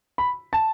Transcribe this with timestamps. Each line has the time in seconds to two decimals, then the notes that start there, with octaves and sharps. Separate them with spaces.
0.18 B5
0.53 A5